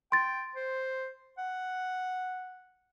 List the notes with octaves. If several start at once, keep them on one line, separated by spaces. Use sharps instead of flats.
G5 C6 A6
C5
F#5